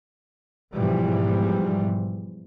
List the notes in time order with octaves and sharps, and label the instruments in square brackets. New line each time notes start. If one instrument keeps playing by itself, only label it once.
[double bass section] G#2 B2 E3 F3 G3